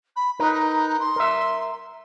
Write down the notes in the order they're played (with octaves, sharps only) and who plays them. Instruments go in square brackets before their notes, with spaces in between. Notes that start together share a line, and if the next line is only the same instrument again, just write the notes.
[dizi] B5
[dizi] D#4 [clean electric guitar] A#4 B4
[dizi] C6
[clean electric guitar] A#4 E5